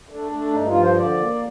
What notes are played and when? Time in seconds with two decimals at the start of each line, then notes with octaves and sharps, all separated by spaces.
0.09 A3 D4
0.32 A3
0.53 G2 D#4
0.67 F4
0.75 F3
0.82 C5
0.96 D3 D5
1.17 A#3